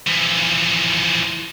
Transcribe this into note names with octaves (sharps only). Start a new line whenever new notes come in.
E3 F3